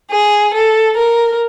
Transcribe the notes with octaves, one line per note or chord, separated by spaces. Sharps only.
G#4
A4
A#4